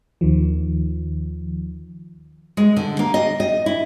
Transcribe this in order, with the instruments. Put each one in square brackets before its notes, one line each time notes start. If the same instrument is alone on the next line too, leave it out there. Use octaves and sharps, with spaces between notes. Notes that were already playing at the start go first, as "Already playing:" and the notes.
[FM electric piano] D#2 D#3 F3
[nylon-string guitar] G#3
D3
A#3
D#5
D#5
E4